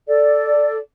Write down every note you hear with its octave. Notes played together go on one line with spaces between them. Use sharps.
A4 D5